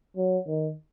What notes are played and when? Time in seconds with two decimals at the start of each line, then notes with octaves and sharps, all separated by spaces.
0.16 F#3
0.47 D#3